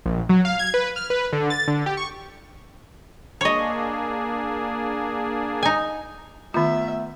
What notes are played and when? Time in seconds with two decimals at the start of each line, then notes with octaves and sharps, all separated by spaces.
0.06 A#1
0.29 F#3
0.45 F5
0.59 G#6
0.74 B4
0.96 F6
1.10 B4
1.33 D3
1.50 A6
1.68 D3
1.86 G4
1.97 C#6
3.41 A#3 D4 G#4 C#5 D#5
5.63 D#4 G#5
6.54 D#3 A3 B3 F4 E5